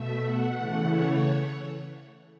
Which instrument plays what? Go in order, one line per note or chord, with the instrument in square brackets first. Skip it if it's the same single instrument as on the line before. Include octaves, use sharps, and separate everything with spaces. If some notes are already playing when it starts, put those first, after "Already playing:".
Already playing: [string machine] B2 A3 E5
F#5
C#3 E3 A3
C#5